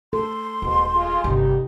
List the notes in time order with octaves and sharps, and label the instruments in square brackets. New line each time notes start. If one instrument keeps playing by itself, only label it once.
[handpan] A4 [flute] C6
[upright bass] D#1 [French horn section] G#2 B2
[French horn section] G#3 F4
[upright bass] G1 C3 [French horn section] G2 D#4 G4